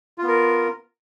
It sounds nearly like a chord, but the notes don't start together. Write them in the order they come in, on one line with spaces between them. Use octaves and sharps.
F4 B3 A#4